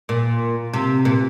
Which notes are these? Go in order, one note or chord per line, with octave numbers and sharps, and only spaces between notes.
A#2
C3
A#2